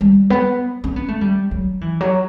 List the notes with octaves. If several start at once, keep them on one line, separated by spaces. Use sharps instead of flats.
G3
B3
C#4
B3
A3
G3
F#3
E3
F#3